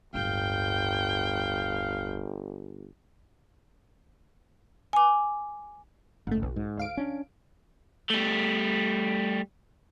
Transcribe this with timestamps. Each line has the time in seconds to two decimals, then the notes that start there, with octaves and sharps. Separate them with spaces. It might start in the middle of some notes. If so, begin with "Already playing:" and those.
0.14 D1 G1 G2 F5 G5 G6
4.93 G#5 D6
6.27 F#1 G#2 A3
6.43 B1
6.56 G#2
6.77 D2 F5 D7
6.97 C#4 D4
8.10 G3 A3